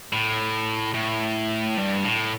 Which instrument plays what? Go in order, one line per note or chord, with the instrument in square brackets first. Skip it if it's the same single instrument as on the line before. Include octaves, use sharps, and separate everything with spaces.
[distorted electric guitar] A2
A2
G2
A2